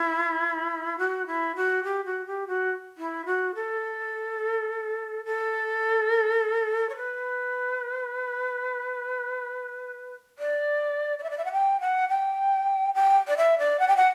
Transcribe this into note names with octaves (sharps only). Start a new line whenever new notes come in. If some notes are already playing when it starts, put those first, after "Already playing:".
Already playing: E4
F#4
E4
F#4
G4
F#4
G4
F#4
E4
F#4
A4
A4
C#5
B4
D5
D5
E5
D5
E5
F#5
G5
F#5
G5
G5
D5
E5
D5
F#5
G5
F#5